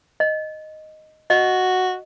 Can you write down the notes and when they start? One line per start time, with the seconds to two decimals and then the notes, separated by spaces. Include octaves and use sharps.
0.20 D#5
1.30 F#4 D#5